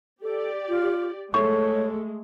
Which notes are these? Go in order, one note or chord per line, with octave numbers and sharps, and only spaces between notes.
G4 A4 D5
F4
G#3 A3 C#5 C#6